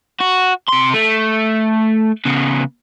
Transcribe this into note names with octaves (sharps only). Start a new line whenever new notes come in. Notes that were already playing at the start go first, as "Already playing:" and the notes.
F#4
C3 C6
A3
C#3 B3